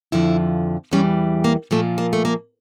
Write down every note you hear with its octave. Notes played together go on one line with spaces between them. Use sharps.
F2 D3 F3 E4
E2 E3 G3 C#4
A#3
A#2 F3 A3
A#3
A3
A#3